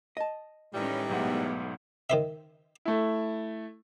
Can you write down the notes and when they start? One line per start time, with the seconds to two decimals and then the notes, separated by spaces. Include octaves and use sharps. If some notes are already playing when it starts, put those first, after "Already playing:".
0.17 D#5 A5
0.74 A2 D#3 E3 G3 G#3 C#4
1.09 B1 G#2 A3 B3 F#5
2.10 D#3 C5 E5
2.85 A3 E4